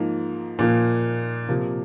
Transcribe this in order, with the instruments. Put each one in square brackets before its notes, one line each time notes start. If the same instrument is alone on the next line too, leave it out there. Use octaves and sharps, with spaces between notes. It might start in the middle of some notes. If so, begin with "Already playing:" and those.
Already playing: [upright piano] G#2 F3 A#3
A#2 F3 A#3
C3 F3 A#3